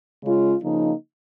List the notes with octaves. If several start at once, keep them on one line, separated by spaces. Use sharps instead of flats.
C#3 G#3 C#4 F4
C#3 F3 A#3 D#4